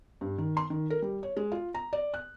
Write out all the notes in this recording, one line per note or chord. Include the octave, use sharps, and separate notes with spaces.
G2
D#3
C6
D#3
A#4
G3
C#5
G#3
F4
A#5
D5
F#6